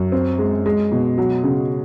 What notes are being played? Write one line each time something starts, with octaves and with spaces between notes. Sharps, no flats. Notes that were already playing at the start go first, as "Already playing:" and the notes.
Already playing: F#2
C4
G#3
G#3
B2
F#3
C#3